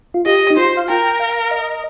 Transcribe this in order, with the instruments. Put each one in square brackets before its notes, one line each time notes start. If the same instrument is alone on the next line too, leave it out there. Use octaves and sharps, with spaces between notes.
[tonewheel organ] F4
[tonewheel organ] G4 [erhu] D#5
[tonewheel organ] D#4
[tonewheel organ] F4 [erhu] C5
[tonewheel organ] F5
[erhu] A#4 [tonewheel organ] G5
[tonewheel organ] F5
D#5